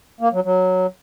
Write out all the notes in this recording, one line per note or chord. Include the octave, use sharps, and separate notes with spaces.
A#3
F#3
F#3